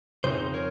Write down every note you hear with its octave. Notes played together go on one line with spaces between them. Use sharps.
F2 C#3 F3 C4 D#4 G#4 C5
A#4 C#5